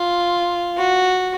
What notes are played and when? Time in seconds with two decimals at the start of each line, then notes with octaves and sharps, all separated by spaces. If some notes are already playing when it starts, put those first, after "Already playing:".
Already playing: F4
0.77 F#4